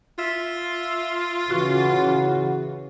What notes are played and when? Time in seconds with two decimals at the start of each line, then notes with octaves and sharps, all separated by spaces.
0.18 F4 E5
1.50 C#3 E3 F#4